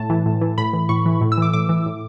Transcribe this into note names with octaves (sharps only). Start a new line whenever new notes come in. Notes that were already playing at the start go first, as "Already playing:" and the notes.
Already playing: A2 A5
E3
A2
E3
A2 B5
E3
A2 C#6
E3
A2
E6
E3 D6
A2 D6
E3
A2